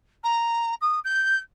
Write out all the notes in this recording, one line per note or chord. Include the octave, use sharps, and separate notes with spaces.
A#5
D#6
G6